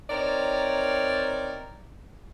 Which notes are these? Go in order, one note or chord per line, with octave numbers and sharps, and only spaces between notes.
C4 D#4 A#4 C#5 D5